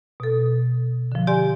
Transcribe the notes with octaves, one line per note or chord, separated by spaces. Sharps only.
B2 A4
D3 F3
G4 D5 G#5 C6